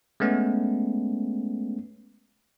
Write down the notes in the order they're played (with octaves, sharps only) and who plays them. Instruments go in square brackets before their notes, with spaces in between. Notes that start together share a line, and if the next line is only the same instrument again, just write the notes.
[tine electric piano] G#3 A3 B3 C#4